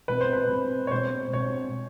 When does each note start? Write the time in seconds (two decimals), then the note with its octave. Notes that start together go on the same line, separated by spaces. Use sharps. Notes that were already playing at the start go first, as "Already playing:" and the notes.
0.08 B2 G#3 C4 B4
0.21 C5
0.33 B4
0.49 B2 G#3 C4
0.87 C#5
0.91 B2 G#3 C4 C5
1.33 B2 G#3 C4 C#5